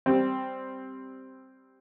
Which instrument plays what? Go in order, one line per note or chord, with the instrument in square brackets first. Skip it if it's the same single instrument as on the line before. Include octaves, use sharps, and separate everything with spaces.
[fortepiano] G3 C4